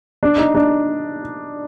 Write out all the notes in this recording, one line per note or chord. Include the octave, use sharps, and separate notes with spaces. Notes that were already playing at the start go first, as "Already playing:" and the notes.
D4
D#4
D4